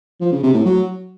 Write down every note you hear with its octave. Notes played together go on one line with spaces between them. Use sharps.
F3
C#3
C3
A2
F#3